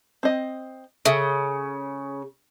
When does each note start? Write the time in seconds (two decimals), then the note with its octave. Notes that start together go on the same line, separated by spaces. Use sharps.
0.23 C4 D#5
1.05 C#3 G#4 A4 E5